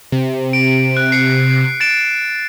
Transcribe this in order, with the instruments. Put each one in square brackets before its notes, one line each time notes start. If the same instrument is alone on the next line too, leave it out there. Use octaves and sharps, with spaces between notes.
[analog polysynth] C3
[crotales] D7
F#6
C7 C#7
A6 D7 E7